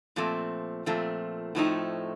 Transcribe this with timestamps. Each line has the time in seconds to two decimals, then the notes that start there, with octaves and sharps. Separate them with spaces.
0.16 A#2 F3 A3 C4
0.86 A#2 F3 A3 C4
1.55 A2 F3 A3 C4 D#4